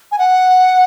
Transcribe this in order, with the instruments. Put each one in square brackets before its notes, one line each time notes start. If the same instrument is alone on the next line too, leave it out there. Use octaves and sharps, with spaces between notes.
[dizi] G#5
F#5